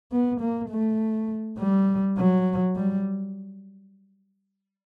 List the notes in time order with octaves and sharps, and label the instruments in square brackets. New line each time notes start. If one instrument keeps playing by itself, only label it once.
[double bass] B3
A#3
A3
G3
F#3
G3